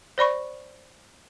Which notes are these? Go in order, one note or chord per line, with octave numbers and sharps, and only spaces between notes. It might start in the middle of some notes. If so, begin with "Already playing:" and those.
C5 D5 B5 C#6